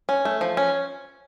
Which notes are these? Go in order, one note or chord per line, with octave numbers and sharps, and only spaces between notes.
C#4
A3
F3
C#4